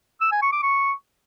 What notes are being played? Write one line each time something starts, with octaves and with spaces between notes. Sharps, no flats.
E6
G#5
C#6
D6
C#6